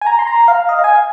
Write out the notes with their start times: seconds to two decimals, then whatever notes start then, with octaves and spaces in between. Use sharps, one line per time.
0.01 G#5
0.07 A#5
0.19 C6
0.27 A#5
0.48 F5
0.69 D#5
0.79 F5
0.84 G#5